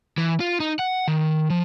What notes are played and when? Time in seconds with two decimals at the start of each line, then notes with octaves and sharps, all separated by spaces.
0.18 E3
0.40 F4
0.60 D#4
0.79 F#5
1.08 D#3
1.50 F3